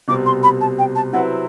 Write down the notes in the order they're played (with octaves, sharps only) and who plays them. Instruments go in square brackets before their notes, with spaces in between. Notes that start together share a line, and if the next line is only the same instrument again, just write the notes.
[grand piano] C2 B2 G3 C4 [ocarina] D6
[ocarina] C6
B5
A5
G5
A5
[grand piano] C3 F#3 C4 E4 B4 [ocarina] F#5